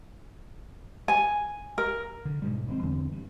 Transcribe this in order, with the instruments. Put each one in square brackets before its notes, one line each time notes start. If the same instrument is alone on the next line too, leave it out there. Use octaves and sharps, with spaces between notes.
[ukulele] G#5
A#4
[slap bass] D3
G#2 B2 G3
G#1 G#3 C4
E2 D3 C4
G2